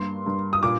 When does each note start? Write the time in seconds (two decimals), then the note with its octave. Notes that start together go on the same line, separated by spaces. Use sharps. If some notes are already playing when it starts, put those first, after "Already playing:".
Already playing: G2 A#3 C6
0.26 G2
0.53 D#6
0.63 A#2 D6